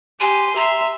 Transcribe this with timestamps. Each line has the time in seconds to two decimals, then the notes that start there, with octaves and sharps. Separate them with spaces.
0.21 G4 G#5 C6
0.56 E5 A#5